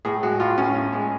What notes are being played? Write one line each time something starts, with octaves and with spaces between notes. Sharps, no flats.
A2 G#4
G#3 F#4
A2 F4
A2 C#4
A2
G#3